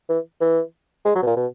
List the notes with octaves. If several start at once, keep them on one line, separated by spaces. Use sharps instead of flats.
E3
E3
G#3
F#3
B2
A#2
B2